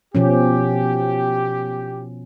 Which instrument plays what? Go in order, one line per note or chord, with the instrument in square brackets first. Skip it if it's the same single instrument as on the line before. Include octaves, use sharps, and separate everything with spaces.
[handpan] B2 F3 C#4 [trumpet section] G4